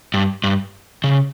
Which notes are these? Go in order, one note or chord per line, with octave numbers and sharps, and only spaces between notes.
G2
G2
C#3